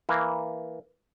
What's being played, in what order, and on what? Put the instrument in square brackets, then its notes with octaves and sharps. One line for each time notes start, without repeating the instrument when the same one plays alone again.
[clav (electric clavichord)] E3 A#3